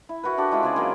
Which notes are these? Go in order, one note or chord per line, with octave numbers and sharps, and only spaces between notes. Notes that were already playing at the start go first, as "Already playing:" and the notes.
E4
E4 F#4 A#4 B4
D4 F#4 G4 A4
G#3 C#4 E4 F4
C#3 C4 G#4 D5
F#3 A#3